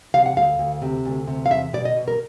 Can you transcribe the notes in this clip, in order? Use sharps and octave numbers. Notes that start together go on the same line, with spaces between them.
C3 F5
F#5
D2 F5
D2
C3
D2
C3
F5
E2 E5
B2 D5
D#5
B2
A#4